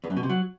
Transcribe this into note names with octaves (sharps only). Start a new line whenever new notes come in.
E2
F#2
B2
C3
F#3